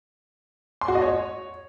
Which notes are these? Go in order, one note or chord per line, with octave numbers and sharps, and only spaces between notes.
C6
F#4
D#5
C#5